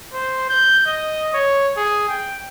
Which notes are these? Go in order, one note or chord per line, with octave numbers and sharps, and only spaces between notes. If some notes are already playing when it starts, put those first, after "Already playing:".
C5
G6
D#5
C#5
G#4
G5